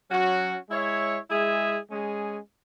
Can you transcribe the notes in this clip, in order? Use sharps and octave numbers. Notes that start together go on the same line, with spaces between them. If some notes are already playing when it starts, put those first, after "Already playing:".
F#3 C#4 F#4
G#3 E4 C#5 E5
G#3 E4 G#4 E5
G#3 C#4 G#4